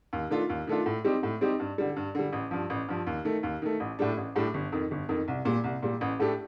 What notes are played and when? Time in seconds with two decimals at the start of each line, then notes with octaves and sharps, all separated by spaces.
0.13 D#2
0.30 D#3 A3 D4 F4
0.49 D#2
0.67 D#3 A3 D4 F4
0.86 A2
1.04 G3 C4 D#4 G4
1.23 A2
1.41 G3 C4 D#4 G4
1.60 G2
1.78 D3 G3
1.96 G2
2.15 D3 G3
2.33 A1
2.51 G2 F3
2.70 A1
2.88 G2 F3
3.07 D#2
3.25 D#3 A3
3.43 D#2
3.62 D#3 A3
3.80 A1
3.99 A2 G3 D4
4.17 A1
4.36 A2 G3 D4
4.54 G1
4.72 F2 D#3
4.91 G1
5.09 F2 D#3
5.28 C2
5.45 A#2 G3
5.64 C2
5.83 A#2 G3
6.01 A1
6.19 A2 A3 D4 G4